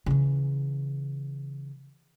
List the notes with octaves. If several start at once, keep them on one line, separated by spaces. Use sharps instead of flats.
C#3 E3